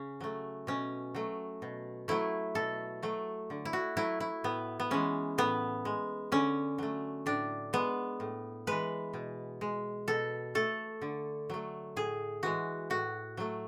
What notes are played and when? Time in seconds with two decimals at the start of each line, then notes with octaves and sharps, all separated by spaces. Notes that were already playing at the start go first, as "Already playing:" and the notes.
Already playing: C#3 C#4
0.21 F#3 A3
0.67 B2 C#4
1.15 F#3 A3
1.62 B2
2.08 F#3 A3 E4
2.55 B2 A4
3.03 F#3 A3
3.50 D3
3.65 E4
3.73 F#4
3.97 F#3 A3 E4
4.20 E4
4.44 A2 B3
4.80 B3
4.91 E3 G#3 C#4
5.38 A2 B3
5.85 G#3
6.32 D3 C#4
6.78 F#3 A3
7.26 A2 D4
7.73 G#3 B3
8.20 A2
8.67 E3 G#3 B4
9.13 B2
9.61 G#3
10.08 B2 A4
10.55 A3 A4
11.02 D3
11.50 F#3 A3
11.96 A2 G#4
12.43 E3 G#3 F#4
12.90 A2 F#4
13.37 F#3 A3